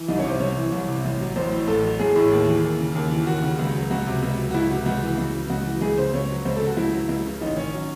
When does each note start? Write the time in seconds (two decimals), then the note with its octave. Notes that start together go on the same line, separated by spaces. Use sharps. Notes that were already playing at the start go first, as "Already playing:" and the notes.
Already playing: E3
0.08 C2 D#4
0.19 C#4
0.24 C3 C5
0.40 C2 C#5
0.57 E3
0.72 C2
0.88 C3
1.04 A1
1.20 F#3
1.36 A1 C5
1.51 A2
1.67 A1 A4
1.84 F#3
1.99 A1 G#4
2.16 A2
2.31 D#2
2.47 E3
2.64 D#2
2.79 C#3
2.95 D#2
3.11 E3
3.27 D#2 F#4
3.43 C#3
3.59 C#2
3.75 F#3
3.91 C#2 F#4
4.06 C3
4.22 C#2
4.39 F#3
4.51 F#4
4.54 C#2 E4
4.70 C3 F#4
4.86 C#2 F#4
5.02 E3
5.18 C#2
5.34 C#3
5.50 C#2 F#4
5.66 E3
5.81 C#2 G#4
5.98 C#3 C5
6.13 C#2 C#5
6.30 F#3
6.45 C#2 C5
6.56 A4
6.62 C#3
6.67 F#4
6.77 C#2 E4
6.93 F#3
7.09 C#2
7.25 C#3
7.41 A1 D#4
7.57 D#3 C#4
7.73 F#3